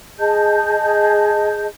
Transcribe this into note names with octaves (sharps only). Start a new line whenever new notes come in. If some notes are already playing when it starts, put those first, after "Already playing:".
G#4 D#5 A5 G6